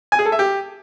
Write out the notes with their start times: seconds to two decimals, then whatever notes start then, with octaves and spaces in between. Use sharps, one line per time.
0.12 G#5
0.19 G#4
0.26 A4
0.32 E5
0.39 G4